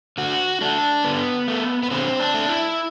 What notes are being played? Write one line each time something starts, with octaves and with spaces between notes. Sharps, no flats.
D3 F#4
A3 D4
D3 B3
A3
B3
D3 C4
D4
A3
E4